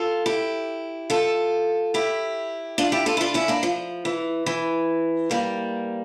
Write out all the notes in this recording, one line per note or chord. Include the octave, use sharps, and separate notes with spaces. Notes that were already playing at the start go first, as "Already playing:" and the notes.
Already playing: F4 A4
E4 G4
F4 A4
E4 G4
D4 F4
E4 G4
F4 A4
E4
D4 F4
C#4 E4
A#3 D4
F3
E3
E3
G3 A#3